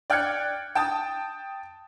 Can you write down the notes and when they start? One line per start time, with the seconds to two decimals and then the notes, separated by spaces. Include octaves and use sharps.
0.10 D5 G5 F6 F#6 G#6 C#7
0.75 G5 A5 D#6 A6